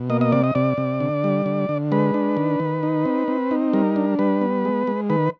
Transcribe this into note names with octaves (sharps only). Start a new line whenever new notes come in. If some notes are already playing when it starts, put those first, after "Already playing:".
Already playing: B2
A#3 D#5
D#5
C3 D5
D#5
C3 D5
C3
D3
G3
D3
D3
G#3 B4
D4
D#3
D#3
D#4
C4
C4
D#4
G3 A#4
D4
G3 B4
B3
G#3
G#3
D#3 B4